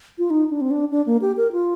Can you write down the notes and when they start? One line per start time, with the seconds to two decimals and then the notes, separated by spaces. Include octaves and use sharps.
0.18 F4
0.30 D#4
0.50 D4
0.61 C4
0.71 D4
0.91 D4
1.06 A#3
1.21 G4
1.37 A#4
1.52 F4